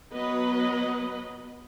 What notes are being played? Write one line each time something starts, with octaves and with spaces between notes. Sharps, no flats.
F#3 B3 B4 D#5